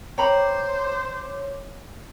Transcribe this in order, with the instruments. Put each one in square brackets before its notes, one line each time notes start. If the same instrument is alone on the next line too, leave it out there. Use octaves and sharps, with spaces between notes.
[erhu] C5 [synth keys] C#5 D6 [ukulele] G5 A#5 B5